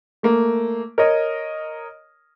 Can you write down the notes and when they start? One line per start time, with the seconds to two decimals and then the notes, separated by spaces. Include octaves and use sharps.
0.23 A3 A#3
0.98 A#4 C#5 D#5